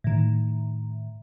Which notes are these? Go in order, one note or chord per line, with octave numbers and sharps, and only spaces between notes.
A2 D#3